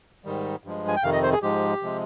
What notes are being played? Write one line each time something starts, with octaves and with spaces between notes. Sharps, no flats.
G#2 D#3 G3
G2 F3 G#3
G#5
G5
F2 C3 D#3 F5
D#5
C5
G#4
G#2 F3 G#3 G4
C3 F3 G#3